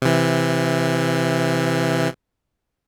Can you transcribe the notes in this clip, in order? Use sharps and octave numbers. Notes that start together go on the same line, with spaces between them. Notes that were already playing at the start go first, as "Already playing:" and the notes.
C3 E3